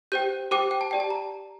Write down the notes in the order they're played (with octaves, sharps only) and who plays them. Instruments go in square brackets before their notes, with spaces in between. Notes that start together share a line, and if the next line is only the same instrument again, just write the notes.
[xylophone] G4 C5 G5 G6
G4 C5 G5 D6
G5
A5
G4 D5 G5
A5
A#5